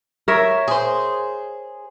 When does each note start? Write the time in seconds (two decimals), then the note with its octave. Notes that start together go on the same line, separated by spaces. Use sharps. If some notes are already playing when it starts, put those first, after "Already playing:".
0.28 A#4 C#5 E5
0.68 G#4 C5